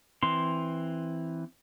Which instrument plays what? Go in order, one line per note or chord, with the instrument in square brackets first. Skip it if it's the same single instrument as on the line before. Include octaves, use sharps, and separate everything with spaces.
[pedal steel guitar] E3 C4 C6